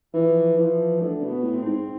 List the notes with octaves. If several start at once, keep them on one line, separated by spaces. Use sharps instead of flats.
E3 F3
E3 F3
D3 A3
B2
B3
A2
C4
G#2